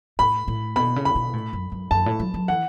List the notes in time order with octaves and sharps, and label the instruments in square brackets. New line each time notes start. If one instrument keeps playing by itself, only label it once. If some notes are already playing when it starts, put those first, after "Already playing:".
[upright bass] A2 [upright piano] B5
[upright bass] A2
[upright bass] B2 [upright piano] B5
[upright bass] C#3
[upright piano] B5
[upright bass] B2
A2
F#2
F#2
[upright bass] F#2 [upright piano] A5
[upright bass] A2
F#3
F#3
[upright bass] E3 [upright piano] F#5